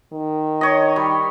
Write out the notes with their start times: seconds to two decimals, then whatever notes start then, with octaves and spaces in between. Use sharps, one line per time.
0.13 D#3
0.61 C#5 D#5
0.96 G3